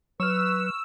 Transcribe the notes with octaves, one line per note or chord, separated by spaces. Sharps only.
F#3 B4 C#6 E6 F6